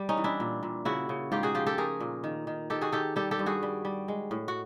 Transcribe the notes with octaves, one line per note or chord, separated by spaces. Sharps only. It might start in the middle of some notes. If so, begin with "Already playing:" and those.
Already playing: G3
C#4 D#4
E3
D4 E4
A#2
A#2
C#3 E4 F#4
C#3
G#2 F4 G4
F#4 G#4
F3 F4 G4
G4 A4
A3 G#4 A#4
A#2
D#3
D#3
D#3 G4 A4
F#4 G#4
D#3 G4 A4
G3 G4 A4
G4 A4
G2
F#4 G#4
G3
G3
G#3
A2
F#4